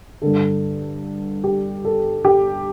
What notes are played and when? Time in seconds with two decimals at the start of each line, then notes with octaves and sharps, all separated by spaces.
0.22 G2 D3 A4
1.44 G4
1.85 A4
2.25 G4